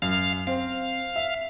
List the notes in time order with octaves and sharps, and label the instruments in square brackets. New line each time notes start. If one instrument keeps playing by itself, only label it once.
[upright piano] F#2 [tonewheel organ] F5
[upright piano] C4 [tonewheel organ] F5
[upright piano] E5